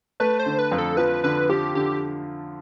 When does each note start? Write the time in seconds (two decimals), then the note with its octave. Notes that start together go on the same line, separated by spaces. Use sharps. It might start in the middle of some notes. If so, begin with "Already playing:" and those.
0.20 A3 B4
0.39 C5
0.46 D3
0.58 B4
0.72 F2
0.78 A4
0.97 F3 B4
1.24 D3 B4
1.49 F3 G4
1.75 D3 G4